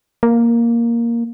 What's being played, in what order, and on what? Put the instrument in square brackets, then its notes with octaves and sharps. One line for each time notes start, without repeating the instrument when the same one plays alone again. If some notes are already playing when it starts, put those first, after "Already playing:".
[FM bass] A#3